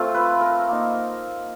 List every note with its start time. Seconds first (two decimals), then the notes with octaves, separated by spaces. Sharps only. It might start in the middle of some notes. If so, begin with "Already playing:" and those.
Already playing: A3 C4 F4
0.15 B4
0.41 A#4
0.69 A#3 D#4